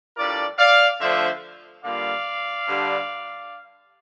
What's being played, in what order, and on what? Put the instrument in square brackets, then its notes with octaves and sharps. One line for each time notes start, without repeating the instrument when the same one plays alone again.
[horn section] A2 G3 D4 F4 A#4 D5
D5 F5
D3 F3 A3 D4 F4 C5 E5
D3 G3 A#3 F4 D5 F5
G2 D3 G3 D4